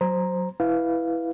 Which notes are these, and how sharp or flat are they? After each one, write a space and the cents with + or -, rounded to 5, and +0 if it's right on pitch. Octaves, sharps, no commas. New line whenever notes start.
F#3 +0 C5 +0 A#5 +0
E4 +0 B4 +0 F5 +0